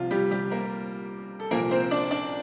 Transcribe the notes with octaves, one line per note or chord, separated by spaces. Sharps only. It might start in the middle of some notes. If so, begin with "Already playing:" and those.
Already playing: C2 C3 F3 F4
G3 G4
G3 G4
A#3 A#4
A4
C2 A#2 F3 A#3 A#4
C4 C5
D4 D5
D4 D5